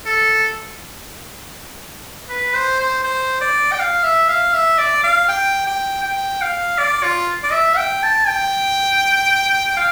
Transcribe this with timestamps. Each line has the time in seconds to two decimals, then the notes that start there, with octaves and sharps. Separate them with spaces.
0.06 A4
2.29 B4
2.55 C5
2.80 C5
3.03 C5
3.41 D5
3.71 G5
3.79 F5
4.03 E5
4.28 F5
4.53 E5
4.78 D5
5.03 F5
5.28 G5
5.66 G5
6.03 G5
6.41 F5
6.78 D5
7.03 F4
7.43 D5
7.52 E5
7.77 G5
8.03 A5
8.27 G5
9.77 F5